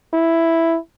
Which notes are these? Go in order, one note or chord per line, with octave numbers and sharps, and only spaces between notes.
E4